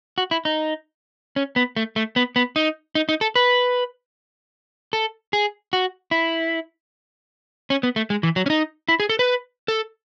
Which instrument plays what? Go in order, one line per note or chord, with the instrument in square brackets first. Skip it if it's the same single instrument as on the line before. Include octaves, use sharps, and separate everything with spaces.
[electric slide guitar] F#4
E4
D#4
C#4
B3
A3
A3
B3
B3
D#4
D#4
D#4
A4
B4
A4
G#4
F#4
E4
C#4
B3
A3
G#3
E3
F#3
C#4
D#4
E4
G#4
A4
B4
A4